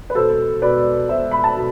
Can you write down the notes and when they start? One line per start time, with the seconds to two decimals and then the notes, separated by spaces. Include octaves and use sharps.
0.10 B4
0.15 B2 A4 C5
0.62 B2 B4 D5
1.09 B2 C5 E5
1.31 B5
1.44 A5
1.56 B2